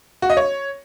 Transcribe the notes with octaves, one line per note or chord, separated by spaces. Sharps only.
F#4
D#5
C#5